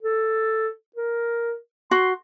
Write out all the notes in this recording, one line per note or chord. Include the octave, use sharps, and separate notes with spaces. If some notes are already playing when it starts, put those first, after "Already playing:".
A4
A#4
F#4 C6